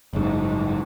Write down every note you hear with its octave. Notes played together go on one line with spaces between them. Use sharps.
F#1 G#2